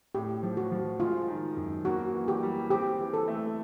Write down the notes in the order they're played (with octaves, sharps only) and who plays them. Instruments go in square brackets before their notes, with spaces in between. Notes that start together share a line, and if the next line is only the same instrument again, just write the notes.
[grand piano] A2 [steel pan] G4
[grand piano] F3
[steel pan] F#4
[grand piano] F3
[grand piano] G#3 [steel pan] F4
[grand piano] D#3
F#2
[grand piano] A#3 [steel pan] F#4
[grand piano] E3
[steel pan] G4
[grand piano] G3
[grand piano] C4 [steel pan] G4
[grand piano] E3
[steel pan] A4
[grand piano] A3